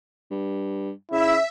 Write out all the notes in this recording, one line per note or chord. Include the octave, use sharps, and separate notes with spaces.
G2
C#3 E4 E5